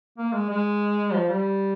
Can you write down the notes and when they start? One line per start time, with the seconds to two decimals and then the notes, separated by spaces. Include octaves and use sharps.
0.18 A#3
0.33 G#3
0.50 G#3
1.12 F3
1.29 G3